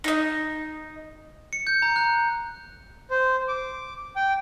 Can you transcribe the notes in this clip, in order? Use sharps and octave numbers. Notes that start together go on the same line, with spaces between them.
D#4 D#5
C#7
G6
A#5
F#6
C5
D6
G5